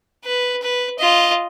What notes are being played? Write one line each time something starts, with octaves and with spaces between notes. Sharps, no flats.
B4
B4
F4 D#5